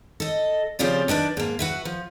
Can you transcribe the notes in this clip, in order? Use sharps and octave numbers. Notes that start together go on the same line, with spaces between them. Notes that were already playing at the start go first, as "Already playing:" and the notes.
A4 D#5
C#3 F3 C4 F4 G4 D5
D#3 D4 B4 D5
G#2 A#3
F#4 B4 E5
F3